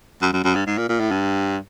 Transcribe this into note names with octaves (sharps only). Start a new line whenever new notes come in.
F#2
F#2
F#2
G2
G#2
A#2
A#2
A2
G2